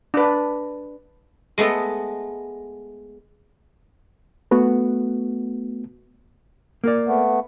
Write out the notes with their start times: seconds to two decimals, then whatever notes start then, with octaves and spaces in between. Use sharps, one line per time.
0.14 D4 B4
1.58 G#3 A3 B3 A4 D#5
4.51 A3 B3 F#4
6.84 A#3 A#4 D5
7.08 A3 B3